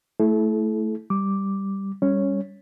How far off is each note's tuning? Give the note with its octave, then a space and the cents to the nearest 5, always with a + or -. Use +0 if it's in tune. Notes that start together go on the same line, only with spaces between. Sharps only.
A3 +0 E4 +0 A4 -35
G3 +0 D6 +0
G3 +15 C#4 +0 C#5 -5